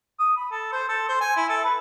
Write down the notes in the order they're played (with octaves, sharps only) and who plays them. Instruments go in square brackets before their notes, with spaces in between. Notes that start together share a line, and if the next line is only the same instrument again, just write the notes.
[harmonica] D#6
B5
A4
C5
A4
C5
G#5
E4
A4
B4